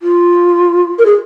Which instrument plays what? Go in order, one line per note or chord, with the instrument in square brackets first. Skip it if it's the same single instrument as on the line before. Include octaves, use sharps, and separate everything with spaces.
[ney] F4
A#4
G#4